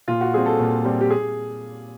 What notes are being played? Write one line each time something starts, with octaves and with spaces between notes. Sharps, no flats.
A#2 F4
F#4
G3 C4 G#4
A4
A#2
G3 C4
G4
G#4